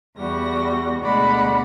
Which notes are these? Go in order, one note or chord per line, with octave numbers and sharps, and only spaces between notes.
E2 G3 F#4 A#6
D2 B2 G#3 D5 F#5 B5